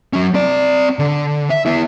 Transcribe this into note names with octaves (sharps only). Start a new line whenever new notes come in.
F#3 C#4
C4 D5
D3
E5
B3 E4